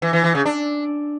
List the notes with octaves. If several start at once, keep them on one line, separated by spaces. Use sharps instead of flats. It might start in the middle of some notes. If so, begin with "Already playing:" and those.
E3
E3
E3
C#3
D4